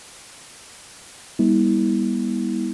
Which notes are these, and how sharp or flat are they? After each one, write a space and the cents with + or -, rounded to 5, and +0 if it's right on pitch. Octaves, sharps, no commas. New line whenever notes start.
G3 +25 B3 -30 E4 -35